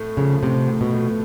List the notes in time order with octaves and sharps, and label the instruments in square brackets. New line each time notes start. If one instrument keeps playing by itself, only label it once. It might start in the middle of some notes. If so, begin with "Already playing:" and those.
Already playing: [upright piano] A2 A3
[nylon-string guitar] C#3 [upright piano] F3
[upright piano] A2 [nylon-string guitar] C3
[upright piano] A2
[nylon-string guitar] B2
[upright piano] A3